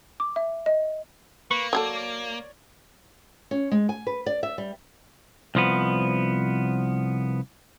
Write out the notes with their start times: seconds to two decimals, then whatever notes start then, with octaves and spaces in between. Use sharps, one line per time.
0.20 D6
0.36 E5
0.66 D#5
1.51 A#3 B4 C#6
1.73 F#3 G4 A4 C#5 D5
3.51 C#4
3.72 G#3
3.89 G#5
4.07 B4
4.26 D5
4.43 E5
4.58 G3
5.55 C2 F3 B3